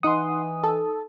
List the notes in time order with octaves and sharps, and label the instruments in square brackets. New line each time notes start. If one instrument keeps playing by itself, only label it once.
[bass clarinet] E3 [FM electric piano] D#4 D#6 [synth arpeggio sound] F#5 C6
[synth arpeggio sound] A4